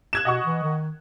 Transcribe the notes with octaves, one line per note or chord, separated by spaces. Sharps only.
F#6 G#6 E7
B2 D#5 F#5 C#6
E3
D#3